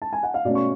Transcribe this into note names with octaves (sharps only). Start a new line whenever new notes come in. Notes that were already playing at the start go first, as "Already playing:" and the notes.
A5
G#5
F#5
F5
B2 A3 C#4 D5
C#6